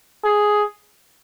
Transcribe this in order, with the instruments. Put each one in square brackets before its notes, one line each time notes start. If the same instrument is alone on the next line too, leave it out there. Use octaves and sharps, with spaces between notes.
[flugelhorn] G#4